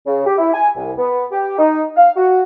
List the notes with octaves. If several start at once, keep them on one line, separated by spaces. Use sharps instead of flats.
C#3
G4
E4
G#5
C2
B3
G4
D#4
F5
F#4